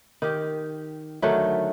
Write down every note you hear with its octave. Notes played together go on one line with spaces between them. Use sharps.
D#3 G4
D3 D#3 F#3 A3